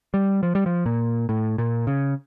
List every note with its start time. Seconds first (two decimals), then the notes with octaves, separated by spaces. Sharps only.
0.14 G3
0.43 F3
0.55 G3
0.66 F3
0.86 A#2
1.29 A2
1.58 A#2
1.87 C#3